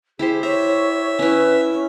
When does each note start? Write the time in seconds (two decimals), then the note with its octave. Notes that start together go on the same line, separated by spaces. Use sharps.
0.19 E4 G4 G#4 C5
0.43 C#5 E5 A#5
1.19 C#4 E4 B4
1.70 C#4